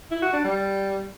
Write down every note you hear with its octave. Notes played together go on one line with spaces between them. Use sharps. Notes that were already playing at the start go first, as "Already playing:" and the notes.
E4
F#4
D4
G3